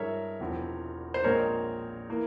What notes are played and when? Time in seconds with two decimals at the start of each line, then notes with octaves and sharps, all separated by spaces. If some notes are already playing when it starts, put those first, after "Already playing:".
Already playing: G2 E3 G#3 A#4 C#5 E5
0.40 E1 E2 C3 F3 C4
1.14 C5
1.23 A#1 A#2 G#3 C4 A#4 C#5
2.10 E3 A#3